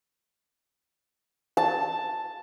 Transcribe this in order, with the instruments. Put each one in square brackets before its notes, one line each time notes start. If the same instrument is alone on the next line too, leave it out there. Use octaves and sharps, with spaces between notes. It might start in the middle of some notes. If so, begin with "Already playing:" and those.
[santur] A5